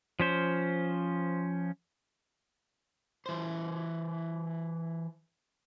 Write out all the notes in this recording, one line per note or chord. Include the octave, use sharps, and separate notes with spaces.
F3 C#4 C5
E3 C5